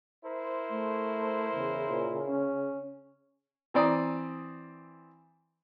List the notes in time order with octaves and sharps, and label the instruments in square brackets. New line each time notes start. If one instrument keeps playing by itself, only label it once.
[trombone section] E4 A#4 C5
[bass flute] A3
[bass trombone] E2 [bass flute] C#3
[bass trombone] A#2
C#4
[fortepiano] E3 C4 D5 A#5 D#6